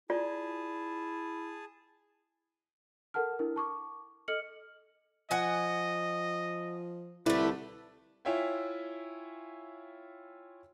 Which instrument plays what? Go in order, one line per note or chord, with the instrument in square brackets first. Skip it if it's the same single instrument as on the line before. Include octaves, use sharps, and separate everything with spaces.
[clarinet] E4 [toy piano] F4 D5 [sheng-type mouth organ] G#4 A5
[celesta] A4 A#4 F#5 A5 F6
D4 E4 A#4
A5 C#6 D6
A4 D#5 F6 C#7 F#7
[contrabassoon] F3 [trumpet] D#5 [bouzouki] F#5 G#5
[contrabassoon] C2 [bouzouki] D3 A3 [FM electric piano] E4 [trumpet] B4
[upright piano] E4 F4 C#5 E5 G5 G#5